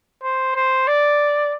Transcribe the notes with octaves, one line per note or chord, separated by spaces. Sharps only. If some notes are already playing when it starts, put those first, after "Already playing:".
C5
C5
D5